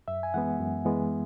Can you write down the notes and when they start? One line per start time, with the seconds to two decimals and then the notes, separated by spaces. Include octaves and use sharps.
0.08 F#2 E5
0.23 G#5
0.34 E3 G#3 B3 F#5
0.60 F#2
0.85 E3 G#3 B3